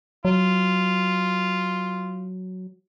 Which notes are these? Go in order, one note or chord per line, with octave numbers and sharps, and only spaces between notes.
F#3 F4